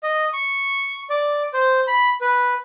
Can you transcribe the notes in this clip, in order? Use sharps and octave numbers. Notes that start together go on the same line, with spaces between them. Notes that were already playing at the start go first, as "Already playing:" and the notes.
D#5
C#6
D5
C5
B5
B4